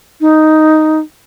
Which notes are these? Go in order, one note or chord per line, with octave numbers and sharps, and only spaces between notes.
D#4